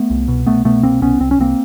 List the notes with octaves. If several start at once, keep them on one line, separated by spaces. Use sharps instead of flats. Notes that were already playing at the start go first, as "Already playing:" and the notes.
Already playing: A3 B3
C2
B2
C2 A3 B3
B2 A3 B3
C2 A#3 C4
C2 B3 C#4
C2 C4
C#4
C2 A#3 C4